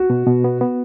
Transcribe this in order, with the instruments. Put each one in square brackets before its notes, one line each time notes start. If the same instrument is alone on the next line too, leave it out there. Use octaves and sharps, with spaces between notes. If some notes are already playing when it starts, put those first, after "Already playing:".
Already playing: [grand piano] F#4
[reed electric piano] B2
B2
B3
B3